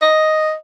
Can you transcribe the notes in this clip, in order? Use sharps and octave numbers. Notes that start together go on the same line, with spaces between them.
D#5